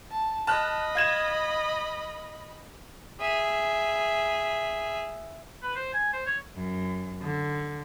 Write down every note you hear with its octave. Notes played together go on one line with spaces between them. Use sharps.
A5
D#5 A5 B5 F6 F#6
F5 G#6 E7
G#4 E5
B4
C5
G#5
C5
C#5
F#2
D3